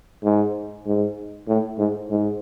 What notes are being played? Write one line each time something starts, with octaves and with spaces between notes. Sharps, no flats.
G#2
G#2
A2
G#2
G#2